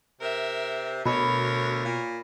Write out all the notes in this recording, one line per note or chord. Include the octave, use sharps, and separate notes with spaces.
C3 A#4 E5
D2 B2 A#4 C#5 B5 D#6
A#2